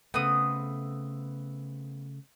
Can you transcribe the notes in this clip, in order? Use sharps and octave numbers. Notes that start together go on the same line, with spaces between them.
C#3 A3 B3 C4 D#6